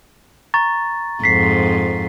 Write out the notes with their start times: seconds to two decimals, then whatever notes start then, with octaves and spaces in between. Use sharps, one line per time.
0.54 A#5 C#6 A6
1.24 F2 G#2 B6 C7